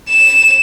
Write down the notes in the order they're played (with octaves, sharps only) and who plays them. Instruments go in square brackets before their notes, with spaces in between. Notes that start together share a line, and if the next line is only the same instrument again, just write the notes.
[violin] E7